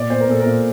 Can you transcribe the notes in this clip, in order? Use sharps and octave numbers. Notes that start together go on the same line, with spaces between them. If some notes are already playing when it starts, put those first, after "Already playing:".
Already playing: A#2 D5
A#2 C5
A#4
A#2 A4
A#4
A#2